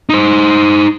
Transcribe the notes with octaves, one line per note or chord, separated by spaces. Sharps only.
D#4 C5